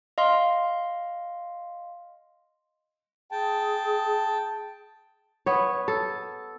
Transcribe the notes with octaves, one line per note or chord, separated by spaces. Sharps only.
D#5 F5 C6
G#4 G5 A5
B3 C#5
A4